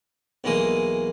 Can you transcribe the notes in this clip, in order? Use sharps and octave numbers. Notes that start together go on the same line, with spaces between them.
B1 E3 G#3 A#3 D#6